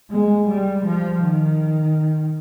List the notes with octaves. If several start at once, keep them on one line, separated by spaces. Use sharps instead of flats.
G#3
G3
F3
D#3